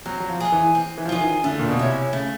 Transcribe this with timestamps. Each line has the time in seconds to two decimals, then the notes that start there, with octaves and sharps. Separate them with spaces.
0.06 F#3 C4
0.20 F#3
0.29 F3
0.41 F4 G#4
0.52 E3
0.75 C4
0.98 E3
1.05 F3
1.09 E3 F4 G#4
1.21 D#3
1.44 D3 A3
1.59 A#2
1.69 B2
1.79 C3 C#4 E4
2.13 C#3 A3